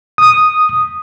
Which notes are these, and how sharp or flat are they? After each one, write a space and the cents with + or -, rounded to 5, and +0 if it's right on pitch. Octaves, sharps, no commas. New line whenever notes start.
D#6 -5